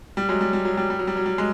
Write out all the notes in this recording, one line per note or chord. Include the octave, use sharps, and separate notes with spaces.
G3
F#3 G#3
G3
G3
F#3
G3
G3
F#3
G3
F#3
G3
G#3